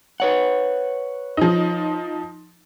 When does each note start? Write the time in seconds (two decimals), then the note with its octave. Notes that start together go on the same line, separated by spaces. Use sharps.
0.20 B4 C#5 F#5
1.37 F3 D#4